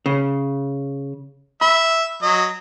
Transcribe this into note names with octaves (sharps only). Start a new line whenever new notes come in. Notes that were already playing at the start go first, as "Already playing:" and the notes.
C#3
E5 B5
F#3 D#5